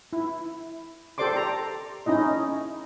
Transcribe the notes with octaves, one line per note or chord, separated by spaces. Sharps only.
E4
G4 A4 C5 D5 C6 D6
A#5
C#4 D#4 E4 D#5